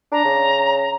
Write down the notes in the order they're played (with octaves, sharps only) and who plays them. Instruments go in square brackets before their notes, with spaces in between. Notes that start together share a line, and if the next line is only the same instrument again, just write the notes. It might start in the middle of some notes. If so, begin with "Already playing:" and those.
[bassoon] D4 [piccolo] A#5
[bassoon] C#3